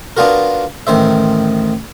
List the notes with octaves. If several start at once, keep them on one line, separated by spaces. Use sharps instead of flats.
B3 D4 F4 F#4 A#4
A1 D#3 C5 E5